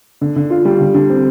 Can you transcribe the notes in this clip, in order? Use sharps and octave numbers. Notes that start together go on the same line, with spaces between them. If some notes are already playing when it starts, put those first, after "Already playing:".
D3
D3
F4
G3
D3
D3
C4